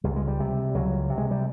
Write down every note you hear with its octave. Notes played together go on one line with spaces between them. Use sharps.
C#2 G3
G#3
G3
C3
C#2 F#3
C3
G#3
G3